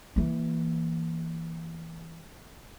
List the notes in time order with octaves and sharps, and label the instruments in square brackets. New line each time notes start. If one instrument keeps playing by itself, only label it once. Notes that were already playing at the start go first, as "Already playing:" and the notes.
[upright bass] E3 A#3